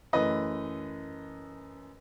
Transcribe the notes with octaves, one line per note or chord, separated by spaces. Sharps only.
F#2 E3 A3 B4 D#5